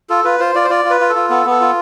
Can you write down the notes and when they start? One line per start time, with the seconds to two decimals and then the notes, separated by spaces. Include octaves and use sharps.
0.10 F4 A4
0.24 F4 B4
0.40 F4 C5
0.55 F4 D5
0.64 C5
0.70 F4 D5
0.85 F4
0.90 B4
1.00 F4
1.10 A4
1.15 F4
1.30 B3 A4
1.46 B3 A4
1.61 F4